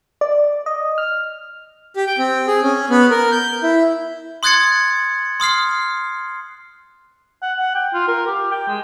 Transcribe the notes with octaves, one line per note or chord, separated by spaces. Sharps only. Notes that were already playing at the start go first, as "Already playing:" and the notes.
D5
D#5
F6
G4
G5
C4
G#4
C#4
B3
A#4
G6
E4
C6 D#6 F#6 G#6 A6 C#7
C6 D#6 F6 C7
F#5
F#5
G5
F4
A#4
G4
G5
G#3